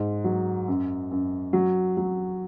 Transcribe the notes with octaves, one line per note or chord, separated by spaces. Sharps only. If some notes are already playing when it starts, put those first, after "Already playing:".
Already playing: G#2
F#3
F#2
F#2
F#3
F#3